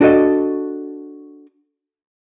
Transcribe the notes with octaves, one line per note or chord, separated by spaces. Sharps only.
D4 F#4 A4 D#5